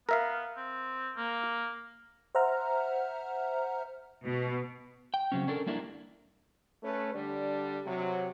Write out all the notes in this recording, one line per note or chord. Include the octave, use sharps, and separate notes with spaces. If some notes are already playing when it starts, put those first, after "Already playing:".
B3 A#4 E5 F5
C4
A#3
C5 E5 F#5 A#5 F6
B2
G5
C#3 F#3 C4 C#4
C#4 D4 A4 A#4
G3 A#3 D4 E4 A#4 D5
A3 C#4 A4 B4
D3 G3 D4
C3 F#3